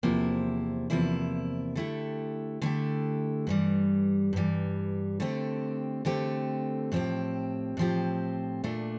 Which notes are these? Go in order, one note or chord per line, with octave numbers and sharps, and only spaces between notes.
E2 C3 F3 A#3 E4
E2 C3 F3 A#3 E4
D3 A3 E4 G4
D3 A3 E4 G4
G2 E3 G3
G2 E3 G3
D3 A3 C4 G4
D3 A3 C4 G4
A2 F3 C4 G4
A2 F3 C4 G4
A#2 A3 D4